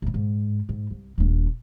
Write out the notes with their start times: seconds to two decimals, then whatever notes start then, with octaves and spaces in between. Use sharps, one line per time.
0.02 A2 C#3
0.14 G#2
0.69 G#2
0.91 C2
1.18 D#1 D4